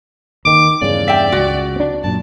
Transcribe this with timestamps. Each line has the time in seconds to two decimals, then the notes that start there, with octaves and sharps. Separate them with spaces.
0.45 D#2 D#3 D6
0.81 E2 G2 C#3 D5
1.08 E5 G5
1.32 C#2 F#4
1.76 C4 D4
2.04 F#2 A#2 A5